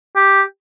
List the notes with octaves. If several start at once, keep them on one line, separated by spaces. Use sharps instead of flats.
G4